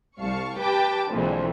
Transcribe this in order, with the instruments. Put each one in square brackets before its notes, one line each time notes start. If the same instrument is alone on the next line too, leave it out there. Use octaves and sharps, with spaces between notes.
[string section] C2 G3 F5 A5 C#6
G4 B4 G5 A5 D6
B1 F2 A#2 D3 E3 G#3